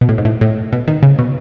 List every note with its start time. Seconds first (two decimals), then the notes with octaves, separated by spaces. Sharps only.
0.01 B2
0.09 A2
0.18 G#2
0.25 A2
0.41 A2
0.73 B2
0.88 D#3
1.03 C#3
1.19 B2